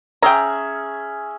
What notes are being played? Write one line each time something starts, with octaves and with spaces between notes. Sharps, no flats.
C#4 G#4 E5 G5 A#5